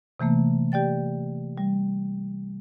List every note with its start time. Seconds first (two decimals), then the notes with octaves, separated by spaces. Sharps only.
0.20 C3 E3 A3 A#3
0.72 G4 D5 G5 A6
1.58 G3